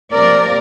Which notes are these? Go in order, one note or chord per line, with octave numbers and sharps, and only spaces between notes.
C3 F3 A#3 A#4 D5